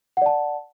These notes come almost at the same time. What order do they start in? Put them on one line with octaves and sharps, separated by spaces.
F#5 D5 A5